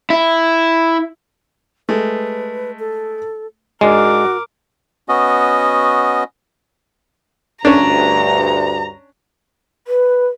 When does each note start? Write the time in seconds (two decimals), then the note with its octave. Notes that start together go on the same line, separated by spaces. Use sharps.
0.10 E4
1.89 G#3 A3 B4
2.79 A4
3.81 G#2 G#3 D4 F#4 A#4 D6
5.09 B3 C#4 F#4 D#5
7.65 D2 G2 C#4 D4 A#5
9.87 B4